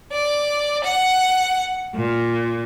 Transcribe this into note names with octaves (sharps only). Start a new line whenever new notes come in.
D5
F#5
A#2